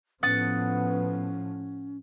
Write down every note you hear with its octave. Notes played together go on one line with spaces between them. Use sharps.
A2 F3 B3 C#4 F#5 D#6 A6